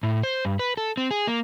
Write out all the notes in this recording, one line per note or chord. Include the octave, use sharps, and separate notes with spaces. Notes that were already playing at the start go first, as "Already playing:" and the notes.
A2
C5
G2
B4
A4
C4
G#4
A#3